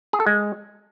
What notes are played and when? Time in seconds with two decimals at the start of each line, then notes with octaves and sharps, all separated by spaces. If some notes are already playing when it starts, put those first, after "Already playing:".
0.13 G#4
0.20 A4
0.26 G#3